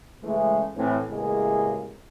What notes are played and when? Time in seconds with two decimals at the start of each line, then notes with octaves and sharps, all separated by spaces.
0.24 C#3 E3 G#3 A3
0.77 A2 E3 C4
1.10 A1 E2 C#3 G#3 A#3 G#4